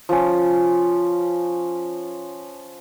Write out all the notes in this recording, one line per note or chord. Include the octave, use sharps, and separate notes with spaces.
F3 C#4